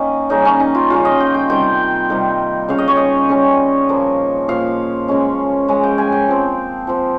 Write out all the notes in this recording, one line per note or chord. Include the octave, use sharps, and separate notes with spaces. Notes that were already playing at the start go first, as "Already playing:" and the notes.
Already playing: D#3 A#3 C#4 D#5
C#3 G3 A#3 C#4 D#4
C#4
D#4
F4
C#3 G3 A#3 C#4 F4
D#5
G5
G5
C3 D#3 G3 G5
C3 D#3 G3
C#3 G3 C#4 F5
D#5
C#5
D#5
C#3 G3 C#4
A#2 F3 A#3
A#2 F3 A#3 F5
C#3 G#3 C#4
C#3 G#3 C#4
G5
G#5
G5
F3 C4
F3 C4